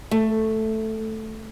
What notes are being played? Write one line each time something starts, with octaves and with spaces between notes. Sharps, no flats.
A3